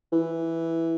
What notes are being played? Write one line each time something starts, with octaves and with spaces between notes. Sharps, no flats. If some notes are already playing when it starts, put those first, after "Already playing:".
E3